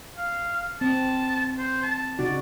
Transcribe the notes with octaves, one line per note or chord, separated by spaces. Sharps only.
F5
C4 A5
C5
A5
C#3 D#4 F#4 D5